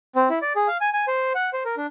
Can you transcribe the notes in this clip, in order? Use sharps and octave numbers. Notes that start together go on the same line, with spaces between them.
C4
E4
D5
G#4
F5
G#5
G#5
C5
F#5
C5
A#4
D4